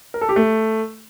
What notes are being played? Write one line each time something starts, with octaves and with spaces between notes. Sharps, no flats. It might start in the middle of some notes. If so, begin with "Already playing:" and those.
A#4
A4
G4
A3